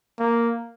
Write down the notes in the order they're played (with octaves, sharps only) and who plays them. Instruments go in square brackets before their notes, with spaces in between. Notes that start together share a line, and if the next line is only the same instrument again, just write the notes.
[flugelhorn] A#3